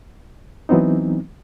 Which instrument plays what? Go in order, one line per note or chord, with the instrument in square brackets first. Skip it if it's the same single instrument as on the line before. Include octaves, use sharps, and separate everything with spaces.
[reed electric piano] E3 F#3 B3 C4 D#4